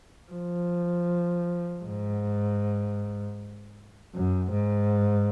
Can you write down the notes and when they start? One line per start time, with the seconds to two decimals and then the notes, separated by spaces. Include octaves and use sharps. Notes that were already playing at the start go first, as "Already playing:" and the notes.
0.31 F3
1.85 G#2
4.15 F#2
4.53 G#2